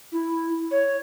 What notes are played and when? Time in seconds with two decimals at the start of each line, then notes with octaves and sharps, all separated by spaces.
0.12 E4
0.71 C#5